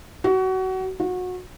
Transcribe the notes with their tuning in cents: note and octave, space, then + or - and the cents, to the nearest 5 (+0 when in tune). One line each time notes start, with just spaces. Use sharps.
F#4 +25
F#4 -25